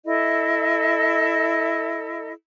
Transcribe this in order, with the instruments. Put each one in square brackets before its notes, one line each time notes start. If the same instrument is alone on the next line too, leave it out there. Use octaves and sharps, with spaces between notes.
[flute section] E4 A4 D#5 E5